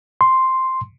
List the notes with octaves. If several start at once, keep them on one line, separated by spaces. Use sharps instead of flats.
C6